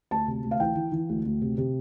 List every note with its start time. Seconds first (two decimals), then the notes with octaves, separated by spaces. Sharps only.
0.11 D2 A5
0.28 C3
0.44 D2
0.51 F5
0.60 E3 G5
0.75 E3
0.92 E3
1.09 D2
1.25 D2
1.42 C3
1.58 C3